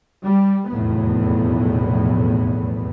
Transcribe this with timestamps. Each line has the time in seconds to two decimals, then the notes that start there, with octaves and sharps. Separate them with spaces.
0.24 G3
0.72 F1 B1 E2 A2 B3